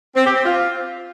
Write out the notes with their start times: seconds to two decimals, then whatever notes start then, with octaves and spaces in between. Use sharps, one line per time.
0.16 C4
0.25 G4
0.35 C4
0.45 F4